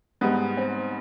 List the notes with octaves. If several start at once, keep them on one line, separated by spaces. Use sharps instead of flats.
G#2 G3 B3
C4